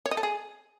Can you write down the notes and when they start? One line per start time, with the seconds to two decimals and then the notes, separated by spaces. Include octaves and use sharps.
0.06 C#5
0.11 D#5
0.17 A4
0.23 G#4